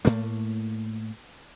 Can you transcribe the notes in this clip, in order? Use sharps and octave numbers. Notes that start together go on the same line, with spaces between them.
A2 A3 A#3